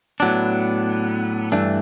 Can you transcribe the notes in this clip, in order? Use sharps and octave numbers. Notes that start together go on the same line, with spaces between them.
A2 F#3 B3 D4
G2 E3 A3 D4